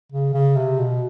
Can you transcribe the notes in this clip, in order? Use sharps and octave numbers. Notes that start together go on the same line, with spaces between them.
C#3
C#3
C3
B2